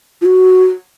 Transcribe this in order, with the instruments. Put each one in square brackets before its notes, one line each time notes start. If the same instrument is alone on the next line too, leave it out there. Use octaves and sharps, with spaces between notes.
[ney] F4
F#4